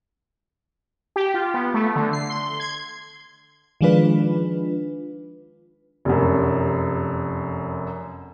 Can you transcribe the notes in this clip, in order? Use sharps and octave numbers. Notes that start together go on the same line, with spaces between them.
G4
F4
B3
A3
D3
C7
C6
G#6
D#3 F3 G#3 D4 F4 B4
F1 F#2